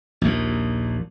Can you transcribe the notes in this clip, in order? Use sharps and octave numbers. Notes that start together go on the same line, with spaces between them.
A#1 D#2 A#2